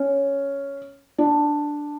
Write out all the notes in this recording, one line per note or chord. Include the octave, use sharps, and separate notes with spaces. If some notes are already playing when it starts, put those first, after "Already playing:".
Already playing: C#4
D4